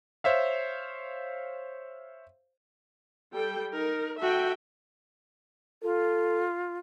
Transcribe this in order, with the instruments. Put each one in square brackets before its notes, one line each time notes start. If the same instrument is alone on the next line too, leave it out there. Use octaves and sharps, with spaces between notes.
[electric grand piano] C5 C#5 E5 F5
[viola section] G3 A4 G5
[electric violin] D#4 [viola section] A#4
[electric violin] F#4 A4 [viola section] E5 G5
[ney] F4 [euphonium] A4